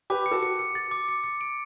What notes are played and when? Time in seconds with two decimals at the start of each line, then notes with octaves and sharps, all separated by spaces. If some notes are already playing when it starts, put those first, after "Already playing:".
0.10 G4 B4 D6
0.26 C#7
0.31 F#4 A4
0.43 C#7
0.59 C#7
0.75 A6
0.91 D6
1.08 C#7
1.24 C#7
1.41 D7